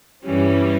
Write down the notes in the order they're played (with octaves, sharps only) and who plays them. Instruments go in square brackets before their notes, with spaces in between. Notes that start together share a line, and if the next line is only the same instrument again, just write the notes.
[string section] G2 E3 G3 C#4